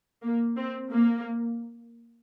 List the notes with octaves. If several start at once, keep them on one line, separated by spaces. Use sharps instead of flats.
A#3
C4
A#3